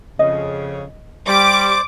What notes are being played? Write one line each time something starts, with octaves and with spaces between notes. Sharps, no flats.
F2 C#3 D#5
G3 C5 D5 D6